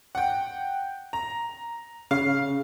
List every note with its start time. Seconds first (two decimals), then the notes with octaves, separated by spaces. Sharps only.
0.15 F#5 G5
1.13 A#5
2.11 C#3 F5